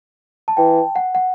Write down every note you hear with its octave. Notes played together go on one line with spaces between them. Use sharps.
A5
E3 G5
F#5
F#5